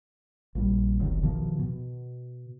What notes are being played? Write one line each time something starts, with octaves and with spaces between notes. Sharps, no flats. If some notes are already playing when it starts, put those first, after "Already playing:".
A#1 G3
F1 B1 D#3
B2 D#3 F3
B2